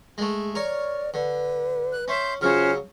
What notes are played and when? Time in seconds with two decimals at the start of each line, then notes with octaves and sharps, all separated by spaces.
0.18 G#3 A3 G#4
0.55 A#4 C#5 D5
1.14 D3 B4
1.91 F#6
2.08 C#4 E5 C6 G6
2.41 C#3 F#3 C#4 F4 C5 F6